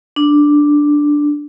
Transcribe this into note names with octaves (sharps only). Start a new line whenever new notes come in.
D4